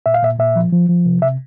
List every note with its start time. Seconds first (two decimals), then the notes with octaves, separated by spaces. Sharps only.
0.06 A#2 E5
0.14 F5
0.23 A#2 E5
0.39 A#2 E5
0.56 F3
0.73 F3
0.89 F3
1.05 C3
1.22 C3 E5